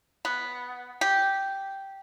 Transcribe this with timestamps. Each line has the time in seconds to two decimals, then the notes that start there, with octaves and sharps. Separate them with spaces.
0.25 B3
1.01 G4